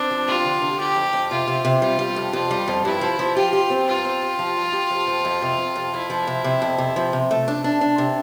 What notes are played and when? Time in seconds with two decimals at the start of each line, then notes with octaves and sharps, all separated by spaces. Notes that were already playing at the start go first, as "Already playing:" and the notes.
Already playing: C4 D4
0.11 F3
0.27 F4 G4
0.45 D3
0.62 D3
0.79 F2 G4
0.96 F2
1.13 F2
1.31 C3 F4
1.47 C3
1.65 C3
1.81 G3 F4
1.99 G3
2.16 F2
2.33 F2 F4
2.51 G3
2.68 F2
2.85 G2 E4
3.01 F3
3.19 F3
3.36 F4 G4
3.53 G4
3.70 C4
3.87 G2 F4
4.05 C4
4.22 G4
4.39 F3
4.56 G2
4.73 G4
4.90 F2
5.07 F3
5.25 F2
5.42 C3
5.58 F2
5.76 F2
5.93 F2 E4
6.10 F3
6.27 C3
6.44 C3
6.62 F2
6.78 C3
6.96 F3
7.13 C3
7.31 A3
7.48 D4
7.64 D4
7.81 D4
7.98 C3